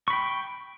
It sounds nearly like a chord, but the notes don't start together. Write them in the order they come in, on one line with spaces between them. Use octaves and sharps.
C#6 B5 G5